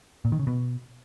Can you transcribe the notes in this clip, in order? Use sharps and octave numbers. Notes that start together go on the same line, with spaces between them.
A#2
D#3
C#3
B2